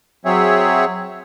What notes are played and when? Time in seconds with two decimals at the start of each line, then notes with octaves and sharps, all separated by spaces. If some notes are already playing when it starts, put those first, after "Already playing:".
0.25 F#3 C4 G#4 C#5 E5